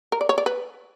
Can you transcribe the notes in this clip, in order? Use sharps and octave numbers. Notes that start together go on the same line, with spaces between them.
A#4
D5
C#5
D5
B4